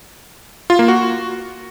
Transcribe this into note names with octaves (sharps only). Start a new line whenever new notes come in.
F4
A#3
F#4